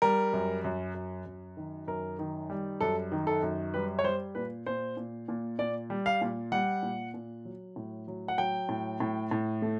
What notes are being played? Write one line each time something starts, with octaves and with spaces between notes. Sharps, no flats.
G3 A#4
F#2
F#2
F#2
F#2
D#3
F#2 A#4
D#3
G3
F#2 A4
D#3
A4
F#2
G3 B4
C#5
G3 C5
A#2 B4
A#2 C5
A#2
A#2
A#2 D5
G3
F5
A#2
G3 F#5
A#2
A#2
F#3
A2
F#3
F#5
F#3 G5
A2
A2
A2
A3